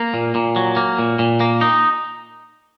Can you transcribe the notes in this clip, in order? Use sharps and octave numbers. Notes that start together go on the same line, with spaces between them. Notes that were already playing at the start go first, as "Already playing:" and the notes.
Already playing: A#3
A#2
A#2
F#3
A#3
A#2
A#2
A#3
D#4